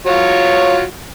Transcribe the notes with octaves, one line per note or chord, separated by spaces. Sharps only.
F#3 F4 C#5